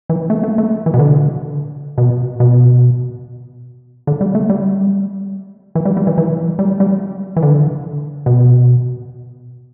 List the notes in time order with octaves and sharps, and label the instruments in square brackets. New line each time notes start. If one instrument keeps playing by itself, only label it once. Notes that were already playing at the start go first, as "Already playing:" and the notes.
[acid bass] E3
A3
A3
A3
E3
B2
D3
B2
B2
D3
G3
A3
G3
E3
G3
G3
E3
E3
G3
G3
E3
D3
B2